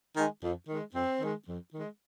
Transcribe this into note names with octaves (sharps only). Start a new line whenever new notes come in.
D#3 G#3
F2
D#3 G#3
F2 C4
D#3 G#3
F2
D#3 G#3